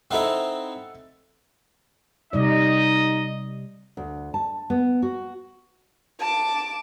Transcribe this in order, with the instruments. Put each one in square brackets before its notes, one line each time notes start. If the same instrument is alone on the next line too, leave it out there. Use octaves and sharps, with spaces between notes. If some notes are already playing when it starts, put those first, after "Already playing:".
[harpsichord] C4 D#4 E4 [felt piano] A4 E5 F#5
[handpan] C3 G3 D5 [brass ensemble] D#4 [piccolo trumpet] D#5
[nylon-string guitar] D2
A5
B3
F#4
[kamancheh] A5 D6